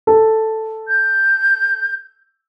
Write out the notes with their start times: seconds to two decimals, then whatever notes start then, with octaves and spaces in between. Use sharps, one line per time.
0.07 A4
0.88 G6